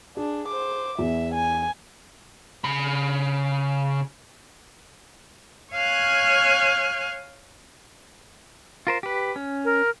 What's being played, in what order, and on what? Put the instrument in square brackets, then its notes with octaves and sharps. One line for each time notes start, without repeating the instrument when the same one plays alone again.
[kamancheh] D4 [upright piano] G#4
[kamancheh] C5 D6
[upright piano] E2 [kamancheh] E5
[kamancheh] G#5
[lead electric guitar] C#3 B5
[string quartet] C#5 F5 G#5 F6 F#6 G#6
[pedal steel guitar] F4 A#4 C5
G4 B4
C#4
[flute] A#4